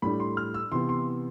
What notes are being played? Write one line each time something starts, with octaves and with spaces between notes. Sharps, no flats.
A2 G3 D4 B5
C6
F6
E6
C3 E3 B3 C6
C6